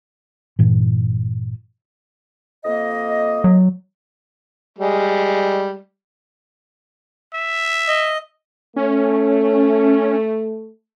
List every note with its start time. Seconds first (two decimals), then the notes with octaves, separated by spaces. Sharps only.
0.59 G2 A#2 E3
2.65 F2 A#3 D#5
3.44 F#3
4.79 G3 G#3
7.34 E5
7.88 D#5
8.76 A3 C#4